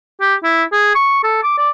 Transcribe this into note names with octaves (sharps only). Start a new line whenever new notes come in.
G4
E4
G#4
C#6
A4
D6
D5